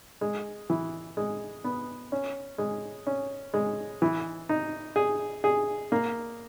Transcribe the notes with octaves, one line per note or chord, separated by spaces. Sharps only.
G#3
E3
G#3
B3
C#4
G#3
C#4
G#3
E3
D#4
G#4
G#4
A#3